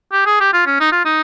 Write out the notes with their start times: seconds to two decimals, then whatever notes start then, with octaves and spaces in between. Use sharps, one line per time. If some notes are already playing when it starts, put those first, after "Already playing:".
0.12 G4
0.26 G#4
0.40 G4
0.53 F4
0.66 C#4
0.80 D#4
0.92 F4
1.05 D#4